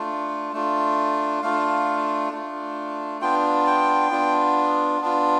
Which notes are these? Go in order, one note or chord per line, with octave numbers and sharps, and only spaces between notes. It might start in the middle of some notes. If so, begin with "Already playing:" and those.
Already playing: A3 D4 F4
A3 D4 F4
A3 D4 F4 F5
A3 D4 F4
B3 D4 F4 G5
G5
B3 D4 F4
B3 D4 F4